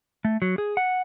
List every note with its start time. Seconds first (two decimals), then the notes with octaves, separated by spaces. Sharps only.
0.25 A3
0.42 F#3
0.58 G#4
0.77 F#5